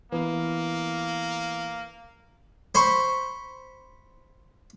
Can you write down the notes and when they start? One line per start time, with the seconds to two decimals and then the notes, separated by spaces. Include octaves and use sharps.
0.12 E3 A#3 B3
2.75 C5 B5 C#6